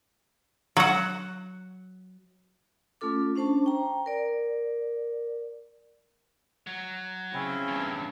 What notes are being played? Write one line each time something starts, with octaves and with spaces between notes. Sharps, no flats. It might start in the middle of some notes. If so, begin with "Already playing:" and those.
F#3 F#5
A3 C#4 F4 A4 D6
C#4 D4 C5 A5 C#6
G5 A#5
A#4 D5
F#3
C#3 C4 C#4 E4
E2 G2